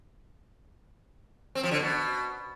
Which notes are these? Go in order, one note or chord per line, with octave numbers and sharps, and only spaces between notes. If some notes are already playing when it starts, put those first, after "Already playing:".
C4
F3
D3
B2